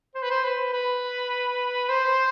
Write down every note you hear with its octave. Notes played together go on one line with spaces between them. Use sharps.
C5
B4
C5
B4
B4
C5